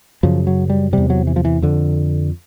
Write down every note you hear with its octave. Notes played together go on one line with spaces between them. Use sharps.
F#2 C#3 F3
F#3
G3
E2 C3 G3
F#3
E3
F3
E3
F2 D3